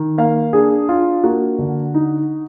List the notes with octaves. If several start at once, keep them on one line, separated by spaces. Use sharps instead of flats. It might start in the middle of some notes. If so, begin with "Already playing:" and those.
Already playing: D#3
A#3 F5
D4 G#4
D4 F4
A#3 F#4
D3
D#4